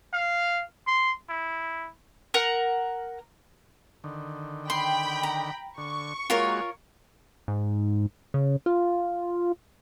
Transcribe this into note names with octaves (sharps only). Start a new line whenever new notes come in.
F5
C6
E4
A#4 F#5 A#5
D3 D#3
G5 B5 C6
A#5
D3 C#6
G#3 A#3 F4 F#4 A#4 C#5
G#2
C#3
F4